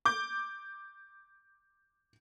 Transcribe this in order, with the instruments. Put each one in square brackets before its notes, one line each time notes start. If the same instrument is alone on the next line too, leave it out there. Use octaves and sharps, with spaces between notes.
[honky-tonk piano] D6 G6